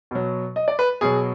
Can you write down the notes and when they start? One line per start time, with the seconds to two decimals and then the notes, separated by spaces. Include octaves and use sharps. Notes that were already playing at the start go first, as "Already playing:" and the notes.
0.11 B2 F#3
0.56 D#5
0.68 D5
0.79 B4
1.01 B2 F#3 G#4